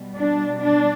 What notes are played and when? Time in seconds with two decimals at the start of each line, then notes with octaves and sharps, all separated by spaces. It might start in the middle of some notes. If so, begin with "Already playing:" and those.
Already playing: B2 G3
0.16 D4
0.62 D4